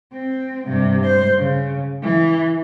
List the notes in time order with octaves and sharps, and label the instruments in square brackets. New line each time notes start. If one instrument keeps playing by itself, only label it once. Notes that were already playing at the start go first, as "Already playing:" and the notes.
[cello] C4
G2 C3
C5
C#3
E3